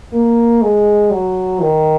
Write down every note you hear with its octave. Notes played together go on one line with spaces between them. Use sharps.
A#3
G#3
F#3
D#3